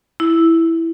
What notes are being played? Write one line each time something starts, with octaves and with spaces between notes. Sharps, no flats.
E4